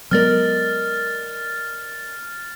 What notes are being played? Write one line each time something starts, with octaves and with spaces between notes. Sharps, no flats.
F#3 G#3 B3 A#4 D5 D#5 F6 A6